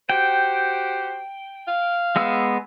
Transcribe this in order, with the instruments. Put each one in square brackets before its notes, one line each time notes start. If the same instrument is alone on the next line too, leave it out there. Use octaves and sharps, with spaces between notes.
[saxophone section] F#4 G4 C5 [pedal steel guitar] G5
[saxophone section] F5
[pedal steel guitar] G#3 B3 E6